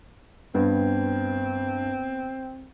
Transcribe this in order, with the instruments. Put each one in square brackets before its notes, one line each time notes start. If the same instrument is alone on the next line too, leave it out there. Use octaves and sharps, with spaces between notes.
[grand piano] G2 [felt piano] B3 [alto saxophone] C4